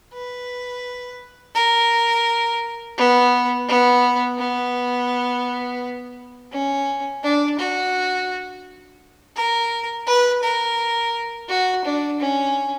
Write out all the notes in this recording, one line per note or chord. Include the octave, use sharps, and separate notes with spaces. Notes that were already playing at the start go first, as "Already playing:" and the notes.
B4
A#4
B3
B3
B3
C#4
D4
F#4
A#4
B4
A#4
F#4
D4
C#4